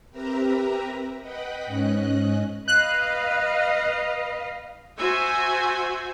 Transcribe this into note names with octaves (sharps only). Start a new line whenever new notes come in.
C4 G4 A#4 B4 E5 A#5
B4 D#5 F#5 G5 B5
G#2 C#4 D#5 F#6
B4 D#5 F5 F#6
F#4 C5 E5 G#5